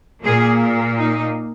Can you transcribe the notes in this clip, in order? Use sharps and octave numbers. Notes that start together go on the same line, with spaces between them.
A#2 A#3 G#4
D#4